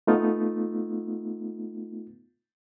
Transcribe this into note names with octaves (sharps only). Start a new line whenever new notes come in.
A3 B3 D#4 F4